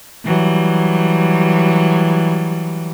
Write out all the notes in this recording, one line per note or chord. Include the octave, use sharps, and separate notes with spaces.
E3 F#3 G3